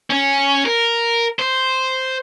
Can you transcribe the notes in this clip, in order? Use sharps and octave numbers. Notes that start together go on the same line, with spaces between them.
C#4
A#4
C5